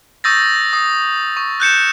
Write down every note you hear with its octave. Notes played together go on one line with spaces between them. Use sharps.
C#6 D#6 E6 G6 A6 A#6
D#6
C#6
F#6 G6 C#7 E7